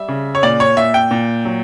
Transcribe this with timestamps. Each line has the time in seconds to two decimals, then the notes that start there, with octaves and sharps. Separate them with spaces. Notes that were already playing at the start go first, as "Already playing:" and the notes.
Already playing: G3 E5
0.08 C#3
0.35 C#5
0.43 A#2 D5
0.60 C#5
0.77 A#2 E5
0.94 G5
1.11 A#2
1.45 F#3